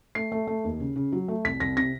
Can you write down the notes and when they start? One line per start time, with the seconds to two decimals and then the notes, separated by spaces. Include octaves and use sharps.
0.15 A3 C7
0.32 A3
0.47 A3
0.64 D#2
0.80 C#3
0.96 C#3
1.12 F#3
1.28 A3
1.45 C2 B6
1.60 C2 A#6
1.77 C3 A#6